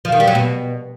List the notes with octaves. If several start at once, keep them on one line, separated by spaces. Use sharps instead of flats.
F3
D#3
G3
F#3
B2